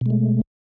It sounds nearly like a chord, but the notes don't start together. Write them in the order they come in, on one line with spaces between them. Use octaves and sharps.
B2 G#3 A3